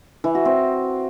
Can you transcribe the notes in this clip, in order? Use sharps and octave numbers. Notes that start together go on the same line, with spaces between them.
E3
F#4
C4